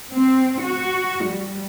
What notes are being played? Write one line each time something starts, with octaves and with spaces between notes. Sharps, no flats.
C4
F#4
G3